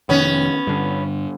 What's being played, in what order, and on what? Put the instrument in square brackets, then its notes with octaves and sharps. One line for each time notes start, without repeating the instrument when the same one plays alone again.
[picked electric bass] F1 D#3 [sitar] B3 C#4
[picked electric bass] G2 D3